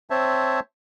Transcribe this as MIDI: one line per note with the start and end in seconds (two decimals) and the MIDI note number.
0.10 0.60 60
0.10 0.60 72
0.10 0.60 73
0.10 0.60 76
0.10 0.60 81